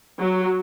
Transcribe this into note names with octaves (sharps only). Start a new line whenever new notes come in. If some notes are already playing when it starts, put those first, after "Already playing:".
F#3